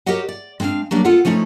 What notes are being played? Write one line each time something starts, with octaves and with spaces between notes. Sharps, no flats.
F#4 G4 A#4 C#5 D#5 F#5
D5
G#3 C4 D4 E4 F5
F#3 G3 A#3 D4
B3 F4 A4 F#5
F3 A3 C#4 D#4 E4